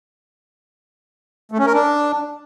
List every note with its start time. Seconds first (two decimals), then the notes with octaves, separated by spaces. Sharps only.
1.52 A3
1.59 C#4
1.66 A#4
1.73 D4